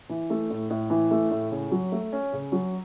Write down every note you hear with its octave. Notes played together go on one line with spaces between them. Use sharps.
E3
A3
A2
A2
E3
A3
A2
C#3
F#3
A3
C#4
C#3
F#3